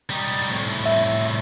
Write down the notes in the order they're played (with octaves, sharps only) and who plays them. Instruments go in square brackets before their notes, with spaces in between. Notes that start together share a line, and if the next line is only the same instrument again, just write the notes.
[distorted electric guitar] G3 D#4
C2 A2
[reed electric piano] E5